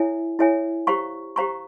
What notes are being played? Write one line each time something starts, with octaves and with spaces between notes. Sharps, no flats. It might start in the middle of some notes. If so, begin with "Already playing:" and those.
Already playing: E4 A4 C#5 E5 G#5
E4 A4 C#5 E5 G#5
G4 C5 F5 A#5 C#6
G4 C5 F5 A#5 C#6